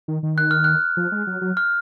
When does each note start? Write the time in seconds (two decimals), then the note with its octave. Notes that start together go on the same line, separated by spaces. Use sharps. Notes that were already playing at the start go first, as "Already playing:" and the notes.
0.08 D#3
0.23 D#3
0.38 F#6
0.51 F6
0.64 F#6
0.97 F3
1.12 G#3
1.27 F#3
1.41 F#3
1.57 F6